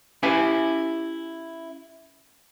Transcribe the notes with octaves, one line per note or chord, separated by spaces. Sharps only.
C#4 E4 G4 B4 E5 G#5